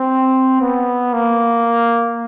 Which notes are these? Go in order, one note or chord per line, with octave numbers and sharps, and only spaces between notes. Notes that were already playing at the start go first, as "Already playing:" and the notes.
Already playing: C4
B3
A#3